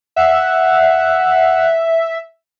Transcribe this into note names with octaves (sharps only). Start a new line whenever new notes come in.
E5 F#5